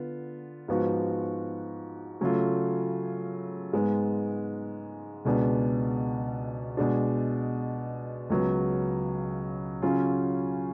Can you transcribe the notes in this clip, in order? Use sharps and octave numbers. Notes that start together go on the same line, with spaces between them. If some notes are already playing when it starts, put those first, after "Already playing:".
Already playing: D3 B3 F4
G#2 F3 B3 F#4
C#3 F#3 A3 F4
G#2 G#3 B3
C#2 B2 G#3 B3 D4
B2 G#3 D4
C#2 C#3 F#3 B3
C#3 F#3 C#4 F4